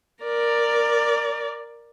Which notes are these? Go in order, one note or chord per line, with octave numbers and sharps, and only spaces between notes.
A#4 D5